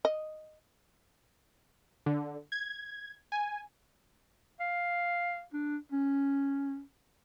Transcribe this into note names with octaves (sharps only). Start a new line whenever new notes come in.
D#5
D3
G#6
G#5
F5
D4
C#4